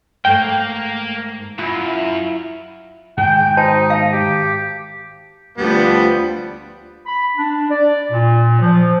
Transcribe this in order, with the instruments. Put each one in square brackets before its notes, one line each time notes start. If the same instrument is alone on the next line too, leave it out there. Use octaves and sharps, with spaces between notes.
[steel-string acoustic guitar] G#2 D#3 A3 [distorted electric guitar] A#3 [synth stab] G5
[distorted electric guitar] F#2 [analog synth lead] E4 [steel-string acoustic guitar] F4
[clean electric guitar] G#2 D#3 G#4 [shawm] G5
[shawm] D#4 [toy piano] F#4 C5 A5
[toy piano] F5 A5
[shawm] G4
[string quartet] D2 F3 D4 [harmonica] G3 B3
[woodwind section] B5
D4
D5
A#2
F3